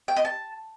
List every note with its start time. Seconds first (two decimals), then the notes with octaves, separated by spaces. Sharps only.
0.08 G5
0.16 D#5
0.25 A5